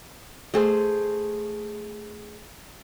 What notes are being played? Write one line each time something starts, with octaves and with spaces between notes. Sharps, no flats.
A3 G#4 C5